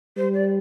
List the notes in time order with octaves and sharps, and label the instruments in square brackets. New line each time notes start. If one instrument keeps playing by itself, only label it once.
[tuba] G3 [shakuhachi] C5
[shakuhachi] D5